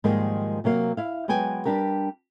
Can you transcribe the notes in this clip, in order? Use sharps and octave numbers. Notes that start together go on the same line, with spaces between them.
G#2 D#3 F3 G3 G#3 A#3
C3 F#3 A#3 F5
E4 F5
F#3 G#3 B3 G5 G#5
G3 D4 G4 A#4